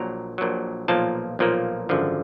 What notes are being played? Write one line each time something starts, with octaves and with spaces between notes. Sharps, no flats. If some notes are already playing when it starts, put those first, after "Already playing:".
Already playing: A#1 A#2 F#3 A#5
A#1 A#2 F#3
B1 A#2 F3 A#3 A5
B1 A#2 F3 A#3
G#1 F#2 D3 F3